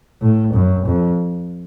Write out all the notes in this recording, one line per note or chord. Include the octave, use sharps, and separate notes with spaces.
A2
F#2
F2